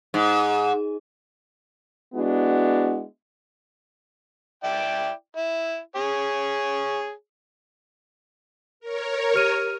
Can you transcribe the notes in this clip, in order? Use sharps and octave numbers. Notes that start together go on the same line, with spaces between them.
G#2
G#3 B3 D4 E4 F#4
E4 D5 G5
E4
G#4 C#5
A#4 C#5
G4 F6 D#7